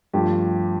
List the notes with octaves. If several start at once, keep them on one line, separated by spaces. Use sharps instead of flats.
G2 F3 A3 G4